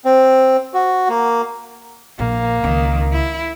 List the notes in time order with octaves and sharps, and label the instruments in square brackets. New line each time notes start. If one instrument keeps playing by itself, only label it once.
[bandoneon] C4
F#4
A#3
[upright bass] A#1 [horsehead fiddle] A#3
[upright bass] C#2 [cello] D#3
[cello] E4